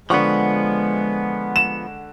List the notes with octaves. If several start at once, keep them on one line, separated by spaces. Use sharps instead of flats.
D3 F3 G#3 B3 F#5 C#6
E7